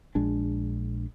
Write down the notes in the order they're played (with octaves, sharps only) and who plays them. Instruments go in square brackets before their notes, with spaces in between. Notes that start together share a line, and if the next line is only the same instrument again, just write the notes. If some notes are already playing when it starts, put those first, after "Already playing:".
[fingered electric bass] A#1 G#3 D4